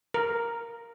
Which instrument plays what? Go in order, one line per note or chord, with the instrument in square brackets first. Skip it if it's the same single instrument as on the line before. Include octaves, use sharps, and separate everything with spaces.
[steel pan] A#4